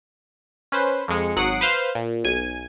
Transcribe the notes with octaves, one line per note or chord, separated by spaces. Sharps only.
C#4 B4 C5
F2 G#3 C#7
G#1 F#3 F#5 D#6 C7 D7
B4 C5 F5
A#2
B1 G#5